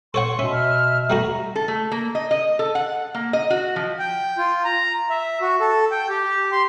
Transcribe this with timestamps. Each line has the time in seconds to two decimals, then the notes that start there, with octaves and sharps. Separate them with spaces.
0.14 A4 C#5 F#5 C6 C#6
0.39 B2 C#4 E5
0.52 F6
1.10 G3 A3 F#4 A#5
1.55 A4
1.68 A3
1.92 A#3
2.15 D#5
2.31 D#5
2.59 A4
2.75 F#5
3.14 A#3
3.33 D#5
3.50 F#4
3.76 F3
3.99 G5
4.38 F4
4.65 A#5
5.10 E5
5.41 F#4
5.61 A4
5.91 G5
6.09 G4
6.52 C6